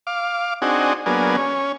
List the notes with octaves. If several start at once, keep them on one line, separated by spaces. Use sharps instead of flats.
F5 D6
C4 D4 D#4 F#4 G#4
F#3 A#3 B3 D4 G#4
C#4